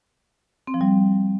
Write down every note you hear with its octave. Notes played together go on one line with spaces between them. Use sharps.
C4
F3
G3